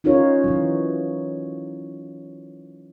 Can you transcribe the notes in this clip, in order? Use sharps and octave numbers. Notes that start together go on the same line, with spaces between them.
C#4 D#4 F4 A#4 C#5
E3 F#3